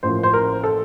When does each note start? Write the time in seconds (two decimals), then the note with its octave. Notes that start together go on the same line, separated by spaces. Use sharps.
0.03 A1 A2 F3 A#3 C5
0.23 C5
0.33 A#4
0.64 A4